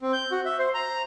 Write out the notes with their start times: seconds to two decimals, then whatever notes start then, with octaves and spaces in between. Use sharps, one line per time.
0.01 C4
0.13 G6
0.31 F#4
0.45 E5
0.59 C5
0.74 A#5